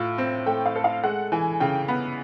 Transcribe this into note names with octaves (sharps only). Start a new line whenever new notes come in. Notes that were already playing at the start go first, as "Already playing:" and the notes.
Already playing: A2 F4
C4
A3 G5
F5
A4
F5
G#3 F#5
E3 G#5
C#3 G5
B3